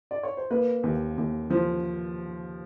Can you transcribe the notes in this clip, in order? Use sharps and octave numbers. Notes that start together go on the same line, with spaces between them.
D5
C#5
C5
A#3 B4
D#2
D#2
F3